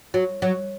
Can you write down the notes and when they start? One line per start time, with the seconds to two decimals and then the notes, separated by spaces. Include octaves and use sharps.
0.14 F#3
0.42 F#3